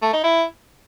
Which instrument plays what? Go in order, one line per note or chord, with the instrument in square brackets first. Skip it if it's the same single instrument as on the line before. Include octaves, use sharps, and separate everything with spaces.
[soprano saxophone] A3
D#4
E4